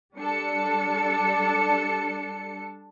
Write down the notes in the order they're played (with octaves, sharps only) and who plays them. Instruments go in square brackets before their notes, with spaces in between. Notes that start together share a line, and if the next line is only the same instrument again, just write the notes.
[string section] G3 D4 A4 C#7